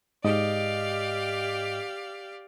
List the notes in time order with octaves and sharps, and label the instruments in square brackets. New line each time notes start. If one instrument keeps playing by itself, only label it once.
[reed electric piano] G#2 D#5 [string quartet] G4 D5 F5